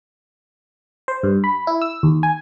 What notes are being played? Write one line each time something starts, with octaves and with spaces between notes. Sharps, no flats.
C5
G2
B5
E4
E6
D#2
G#5